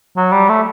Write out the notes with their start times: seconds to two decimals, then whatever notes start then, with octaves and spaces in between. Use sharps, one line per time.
0.17 F#3
0.32 G3
0.49 A3